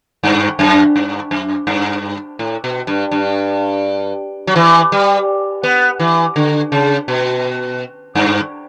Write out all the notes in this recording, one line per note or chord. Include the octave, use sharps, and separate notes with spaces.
G2
F#2
G2
F#2
G2
A2
B2
G2
G2
F#3
E3
G3
B3
E3
D3
C#3
B2
G2